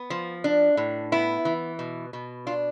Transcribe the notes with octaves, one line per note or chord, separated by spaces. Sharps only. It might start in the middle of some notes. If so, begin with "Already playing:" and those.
Already playing: B3
F3
D4
A2
B3 E4
E3
B2
B2
D4 F4